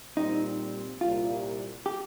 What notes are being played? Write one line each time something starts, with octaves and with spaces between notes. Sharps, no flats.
A#2 G3 C4 D#4
C2 A#2 G3 F4
G4